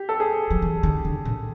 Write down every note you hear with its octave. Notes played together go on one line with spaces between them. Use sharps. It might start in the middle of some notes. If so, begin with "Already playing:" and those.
Already playing: G4
A4
G#4
F3
E3
D#3
D3
A#2